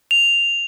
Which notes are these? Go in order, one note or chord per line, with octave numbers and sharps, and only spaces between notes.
F7